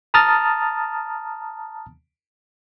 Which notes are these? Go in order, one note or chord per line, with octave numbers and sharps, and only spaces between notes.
A5 A#5 D#6 F6 A6